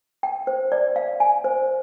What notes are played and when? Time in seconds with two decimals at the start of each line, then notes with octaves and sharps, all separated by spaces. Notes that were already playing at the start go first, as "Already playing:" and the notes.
0.23 G5
0.47 C5
0.72 D5
0.96 F5
1.20 G#5
1.44 C5